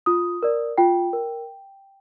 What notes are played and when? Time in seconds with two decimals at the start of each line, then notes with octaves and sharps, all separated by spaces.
0.06 F4 D#6
0.43 A#4 D5
0.78 F4 G5
1.13 A#4